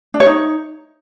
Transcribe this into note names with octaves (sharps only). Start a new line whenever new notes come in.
D4
C#5
D#4